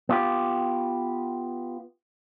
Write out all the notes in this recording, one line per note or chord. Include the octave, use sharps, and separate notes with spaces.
B3 F4 G4